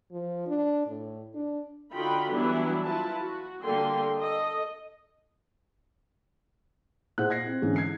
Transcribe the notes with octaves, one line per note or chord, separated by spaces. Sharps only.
F3
D4
A2
D4
D3 D#4 F4 F#4 G5 B5
E3 F#3 G3 B3 D4 E4
E4 F4 B4 A5
F#4
D3 G3 A#3 G5 C6
A4 D#5
A#2 E4 G#4 C5 F#5 F#6
G#6 A#6 C7
C4
G#2 D3 E3 C#4
G#6 C7